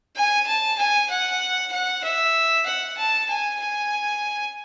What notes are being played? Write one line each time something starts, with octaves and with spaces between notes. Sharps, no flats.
G#5
A5
G#5
F#5
F#5
E5
F#5
A5
G#5
G#5